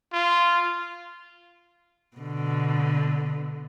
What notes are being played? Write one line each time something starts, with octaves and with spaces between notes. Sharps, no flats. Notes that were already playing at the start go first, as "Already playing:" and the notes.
F4
B2 D3